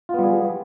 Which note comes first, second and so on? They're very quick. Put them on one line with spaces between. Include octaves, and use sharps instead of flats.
F4 B3 G3 G#4